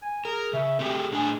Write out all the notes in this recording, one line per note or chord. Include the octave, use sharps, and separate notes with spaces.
G#5
G#4 A#4
C#3 E5
A3 C4 G4 G#4
A2 D4 G#4 G#5